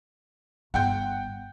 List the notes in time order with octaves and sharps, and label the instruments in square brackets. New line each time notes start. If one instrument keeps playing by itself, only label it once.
[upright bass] G1 [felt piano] F#5 G5 G6